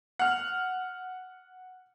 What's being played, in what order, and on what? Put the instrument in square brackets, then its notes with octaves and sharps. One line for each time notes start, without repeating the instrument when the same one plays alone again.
[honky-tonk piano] F#5 F6